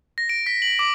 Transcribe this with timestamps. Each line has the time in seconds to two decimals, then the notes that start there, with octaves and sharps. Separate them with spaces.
0.18 A#6
0.29 D7
0.46 B6
0.62 F#7
0.79 D6